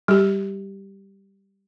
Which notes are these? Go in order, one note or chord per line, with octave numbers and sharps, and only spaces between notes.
G3 G4